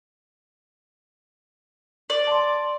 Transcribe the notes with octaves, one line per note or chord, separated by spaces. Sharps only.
D5
A5 C6